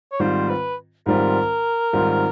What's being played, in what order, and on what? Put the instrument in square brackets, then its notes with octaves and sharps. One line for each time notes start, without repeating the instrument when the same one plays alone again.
[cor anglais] C#5
[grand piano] G#2 D#3 G3 C4 F4 [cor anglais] C5
[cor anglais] B4
[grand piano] G#2 D#3 G3 C4 F4 [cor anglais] A#4
[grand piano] G#2 D#3 G3 C4 F4